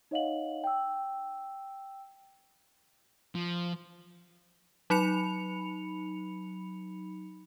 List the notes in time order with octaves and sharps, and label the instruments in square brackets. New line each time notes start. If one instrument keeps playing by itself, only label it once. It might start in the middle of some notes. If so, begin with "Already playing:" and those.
[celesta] D#4 C#5 D#5 F5 F#5 F#7
G5 E6
[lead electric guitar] F3
[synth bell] F#3 D#4 B5 C#7 F7